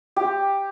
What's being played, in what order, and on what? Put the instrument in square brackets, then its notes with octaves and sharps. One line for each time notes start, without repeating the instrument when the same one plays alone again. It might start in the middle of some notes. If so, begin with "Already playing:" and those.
[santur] G4